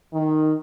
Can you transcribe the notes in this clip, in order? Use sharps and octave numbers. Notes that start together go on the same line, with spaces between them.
D#3